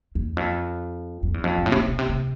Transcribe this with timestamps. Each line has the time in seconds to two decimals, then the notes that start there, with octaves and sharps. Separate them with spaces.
0.15 E2
0.37 F2
1.23 F2
1.34 E2
1.44 F2
1.57 G#2
1.66 A2
1.72 C3
1.77 B2
1.88 B2
1.99 C3
2.09 C3